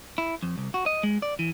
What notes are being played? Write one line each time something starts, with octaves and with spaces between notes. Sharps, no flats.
E4
F2
C2
F#4
D#5
G#3
D5
E3